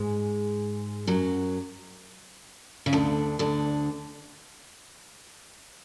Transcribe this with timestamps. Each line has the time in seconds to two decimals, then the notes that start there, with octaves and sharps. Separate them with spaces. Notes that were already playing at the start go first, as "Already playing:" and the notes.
Already playing: G#2 G#3
1.07 F#2 F#3
2.86 C#3
2.93 D2 D3
3.39 D2 D3